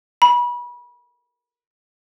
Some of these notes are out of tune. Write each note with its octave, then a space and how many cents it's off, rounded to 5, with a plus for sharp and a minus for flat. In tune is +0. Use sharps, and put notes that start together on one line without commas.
B5 -30